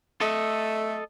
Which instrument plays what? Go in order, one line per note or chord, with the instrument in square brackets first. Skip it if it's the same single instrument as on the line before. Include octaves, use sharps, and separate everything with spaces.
[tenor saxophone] A3 [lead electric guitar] A4 D#5